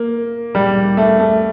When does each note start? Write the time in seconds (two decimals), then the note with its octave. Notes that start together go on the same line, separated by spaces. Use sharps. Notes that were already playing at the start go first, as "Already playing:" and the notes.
Already playing: A#3
0.55 G3
0.97 A3
1.20 A3